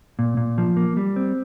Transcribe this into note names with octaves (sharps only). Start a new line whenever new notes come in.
A#2
A#2
F3
A#3
G3
C4